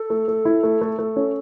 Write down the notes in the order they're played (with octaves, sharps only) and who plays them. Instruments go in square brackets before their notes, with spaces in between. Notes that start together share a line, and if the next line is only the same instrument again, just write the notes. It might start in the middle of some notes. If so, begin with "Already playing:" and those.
Already playing: [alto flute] A4
[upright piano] A3
A3
E4
A3
A3
A3
C#4